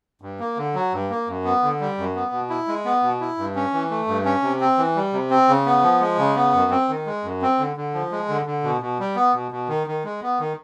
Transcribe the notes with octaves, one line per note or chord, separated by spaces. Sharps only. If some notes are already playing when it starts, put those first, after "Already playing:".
G2
A#3
D3
F#3
G2
A#3
F#2
B3
D3
G3
F#2
B3
B2
E4
G#3
B3
B2
E4
G2
C#4
E3
A3
G2
C#4
C3
C4
E3
G3
C3
C4
C#3
B3
F3
G#3
C#3
B3
F#2
C4
D#3
G#3
F#2
C4
D3
D3
F3
G#3
D3
D3
B2
B2
G3
B3
B2
B2
D#3
D#3
G#3
B3
D#3